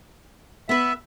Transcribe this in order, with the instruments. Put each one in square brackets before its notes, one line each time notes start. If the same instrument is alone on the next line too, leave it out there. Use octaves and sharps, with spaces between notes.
[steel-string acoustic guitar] B3 B4 [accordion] E5